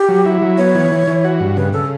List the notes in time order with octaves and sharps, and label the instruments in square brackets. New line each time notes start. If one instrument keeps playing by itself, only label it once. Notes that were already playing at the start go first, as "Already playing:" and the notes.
Already playing: [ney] G4
[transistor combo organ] F#3
E4
F#3
[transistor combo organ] B3 [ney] C#5
[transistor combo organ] E3
E3
E3
F#4
G2
[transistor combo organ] C#3 [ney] B4
[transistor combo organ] C#3 [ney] A4